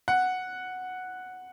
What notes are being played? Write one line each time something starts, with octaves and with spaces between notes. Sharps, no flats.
F#5